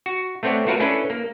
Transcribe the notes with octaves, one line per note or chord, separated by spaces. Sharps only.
F#4
A3 B3 C4 C#5 D5 F#5
A3 F4 F#4 A#4 B4 C#5
C#4 D4 E4 A4 B4
A#3